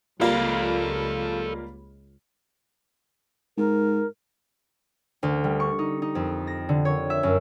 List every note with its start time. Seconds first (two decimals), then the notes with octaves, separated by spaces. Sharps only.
0.21 C#2 G3 A#3 F4 A4 F5
3.58 G#2 A#4
5.23 D2
5.44 G3
5.60 C#6
5.79 D#4
6.02 D#4
6.15 F2
6.47 A#6
6.69 D3
6.85 C#5
7.10 E5
7.23 F#2